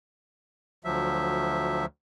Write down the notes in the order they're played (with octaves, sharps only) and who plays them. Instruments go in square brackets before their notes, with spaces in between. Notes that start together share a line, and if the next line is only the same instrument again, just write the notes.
[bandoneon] D2 F3 F#3 E5